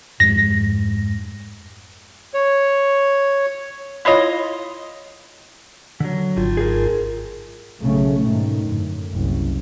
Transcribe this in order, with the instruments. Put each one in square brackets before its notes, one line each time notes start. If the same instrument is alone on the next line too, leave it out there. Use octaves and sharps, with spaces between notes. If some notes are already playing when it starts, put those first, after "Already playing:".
[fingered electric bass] F2 G#2 G#3 [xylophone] A#6
[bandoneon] C#5
[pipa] E4 F4 C#5 D#5
[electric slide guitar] D3 F#3
[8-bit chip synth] G#1 G#2 F4
[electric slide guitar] G#4 A#4
[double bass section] B1 C#3 F#3 A3 C#4
G#2 B2 D#3
F#2 A2 D3
F#1 C2